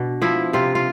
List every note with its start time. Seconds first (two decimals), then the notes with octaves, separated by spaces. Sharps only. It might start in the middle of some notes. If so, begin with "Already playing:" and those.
Already playing: B2 D4
0.22 F3 E4
0.53 C3 F4
0.75 F4